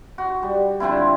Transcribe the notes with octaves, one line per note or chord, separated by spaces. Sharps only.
F#4
G3
D3 F3 C4 E4